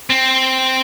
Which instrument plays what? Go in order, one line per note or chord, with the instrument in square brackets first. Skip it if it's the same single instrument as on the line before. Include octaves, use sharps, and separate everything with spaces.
[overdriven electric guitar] C4